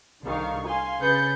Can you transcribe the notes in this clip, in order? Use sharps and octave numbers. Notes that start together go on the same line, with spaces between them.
C2 D3 D#3 F5 C#6
F5 G#5 C6
C#3 G#4 B4 G6 A6 C#7